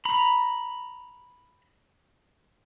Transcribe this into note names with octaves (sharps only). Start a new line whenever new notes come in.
A#5 B5